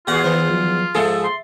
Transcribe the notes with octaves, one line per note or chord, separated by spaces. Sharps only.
E2 F4 F#4 G#4 F#5
D#3 B4 C5
F3 F#3
G#2 F3 G#4 A4 E5 A6
C6